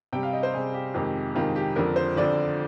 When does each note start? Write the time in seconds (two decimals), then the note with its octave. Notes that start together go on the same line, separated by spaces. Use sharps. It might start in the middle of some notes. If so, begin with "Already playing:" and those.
0.13 C3 G3 G5
0.23 F5
0.33 D#5
0.43 C5
0.53 C3 G3 G#4
0.74 G4
0.94 F2 C3 D#3 G#3
1.35 F2 C3 D#3 G#3 F4
1.56 G4
1.76 F2 D3 F3 A#4
1.96 C5
2.16 F2 D3 F3 D5